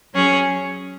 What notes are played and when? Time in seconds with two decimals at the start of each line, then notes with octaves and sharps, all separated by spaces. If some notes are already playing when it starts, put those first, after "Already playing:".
0.13 F#3 C#4 G#4 C#5